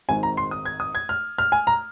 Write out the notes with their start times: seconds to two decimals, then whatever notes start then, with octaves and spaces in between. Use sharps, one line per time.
0.09 G#1 G#2 D#3 G#5
0.23 A#5
0.37 C6
0.51 D#6
0.65 G#6
0.80 D#6
0.95 G#6
1.09 F6
1.38 F6
1.52 G#5
1.67 A#5